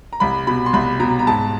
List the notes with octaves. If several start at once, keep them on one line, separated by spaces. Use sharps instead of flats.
A#5
C2 B5
B2 B5
C6
C2 B5
B2 A#5
A#5
G#2 A5